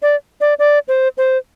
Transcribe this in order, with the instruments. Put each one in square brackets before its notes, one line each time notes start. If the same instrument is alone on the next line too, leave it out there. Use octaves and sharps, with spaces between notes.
[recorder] D5
D5
D5
C5
C5